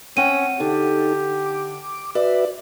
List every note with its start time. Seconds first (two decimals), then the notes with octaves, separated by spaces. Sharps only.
0.17 C4 C#4 F#5 G5 D#7
0.60 D3 D#4 G4 A4
1.46 D6
2.15 F#4 B4 D5 E5